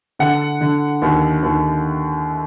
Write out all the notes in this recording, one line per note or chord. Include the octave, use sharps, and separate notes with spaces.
D3 F#5
D3
D#2
D#2